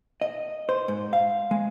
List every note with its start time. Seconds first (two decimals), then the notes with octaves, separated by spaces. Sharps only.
0.21 D#5
0.69 C5
0.88 G#2
1.13 F5
1.51 G#3